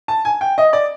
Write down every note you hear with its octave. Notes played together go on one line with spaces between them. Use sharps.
A5
G#5
G5
D#5
D5